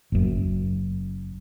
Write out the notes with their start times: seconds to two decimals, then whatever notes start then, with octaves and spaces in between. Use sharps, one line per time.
0.12 F#1 F#2